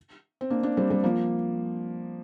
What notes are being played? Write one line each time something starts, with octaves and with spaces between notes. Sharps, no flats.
C4
A#3 D4
A#3 D4
G3 C4
G3 C4
F3 A#3